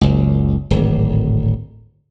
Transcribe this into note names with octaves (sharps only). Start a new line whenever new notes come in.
F#1 C#2
D1 G#1